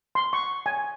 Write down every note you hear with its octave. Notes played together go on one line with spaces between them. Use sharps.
C6
C#6
G#5